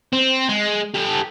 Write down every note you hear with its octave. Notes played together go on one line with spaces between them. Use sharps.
C4
G#3
G4 A4